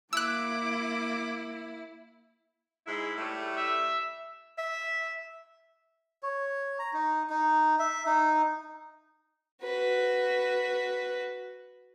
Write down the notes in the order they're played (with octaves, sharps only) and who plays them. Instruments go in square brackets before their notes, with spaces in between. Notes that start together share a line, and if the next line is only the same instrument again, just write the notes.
[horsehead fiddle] A#3 [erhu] E4 [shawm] D6 [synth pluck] E6 F#6
[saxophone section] G#2 G#3 E4
A2 G3 A3
[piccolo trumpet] E5
[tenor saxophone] E5
[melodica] C#5
A#5
D#4
D#4
E5
D#4
[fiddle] F#4 B4